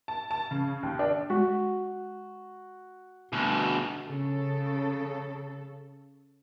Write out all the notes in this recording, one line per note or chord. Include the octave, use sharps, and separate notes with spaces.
A5
A5
C#3
D#2
D4
G#3 F#4
D2 B2
C#3 A4